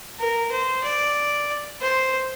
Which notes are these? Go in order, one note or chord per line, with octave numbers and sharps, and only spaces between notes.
A#4
C5
D5
C5